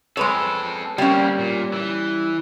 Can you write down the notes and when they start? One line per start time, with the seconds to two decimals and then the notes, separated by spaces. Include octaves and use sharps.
0.17 G#3 C4 A4 B4 C#5
0.98 G3 A#3 C4 C#4
1.39 A#2
1.73 E3